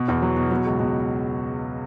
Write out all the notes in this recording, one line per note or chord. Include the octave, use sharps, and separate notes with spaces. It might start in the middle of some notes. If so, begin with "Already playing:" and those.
Already playing: B2
E2
F#3
B2
F#3
C#2
B2